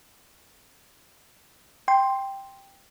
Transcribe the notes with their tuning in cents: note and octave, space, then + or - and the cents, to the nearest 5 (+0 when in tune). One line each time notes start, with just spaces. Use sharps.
G5 +0 C6 +0